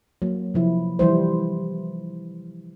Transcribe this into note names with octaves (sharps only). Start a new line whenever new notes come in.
F#3 A#3
C3 F3 E4
E3 F3 G3 E4 C5